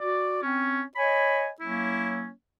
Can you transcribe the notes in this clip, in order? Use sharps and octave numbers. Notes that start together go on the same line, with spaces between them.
F#4 D5
C4 C#4
C#5 D#5 G#5 B5
F#3 A#3 C#4 E4